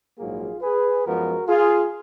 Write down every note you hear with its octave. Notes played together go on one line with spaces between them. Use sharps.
A#1 G#2 F#3 A#3 F4 G#4
G#4 B4
F#2 F3 G#3 B3 F#4 A#4
F4 G#4